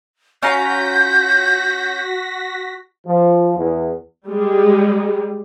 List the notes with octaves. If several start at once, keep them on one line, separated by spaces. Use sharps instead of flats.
C#4 F4 F#4 A#5 G6 A#6 B6
F3
E2
G3 G#3